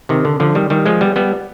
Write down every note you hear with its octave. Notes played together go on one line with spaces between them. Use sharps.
C3 D#3
D3
D3 F3
D#3 G3
D#3 G3
F3 G#3
G3 B3
G3 B3